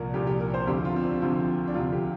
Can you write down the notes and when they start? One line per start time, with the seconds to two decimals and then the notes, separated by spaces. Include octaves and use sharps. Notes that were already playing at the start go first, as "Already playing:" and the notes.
Already playing: C2 A#2 F3 A#4
0.14 C2 A#2 F3 G4
0.27 G4
0.40 A#4
0.54 C5
0.67 D2 C3 F3 G4
0.85 F4
0.96 C4
1.03 D4
1.21 D2 C3 F3
1.68 D4
1.74 D2 C3 F3 F4
1.93 G4